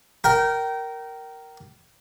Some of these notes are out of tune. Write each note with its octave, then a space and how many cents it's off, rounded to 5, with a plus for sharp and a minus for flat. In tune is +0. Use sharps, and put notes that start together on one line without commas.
A#4 +0 G5 -25